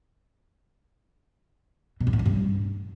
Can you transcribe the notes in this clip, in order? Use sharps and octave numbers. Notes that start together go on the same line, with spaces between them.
B2
F#2
A2
D3
G2